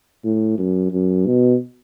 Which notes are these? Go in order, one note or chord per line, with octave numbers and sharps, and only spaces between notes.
A2
F#2
F#2
B2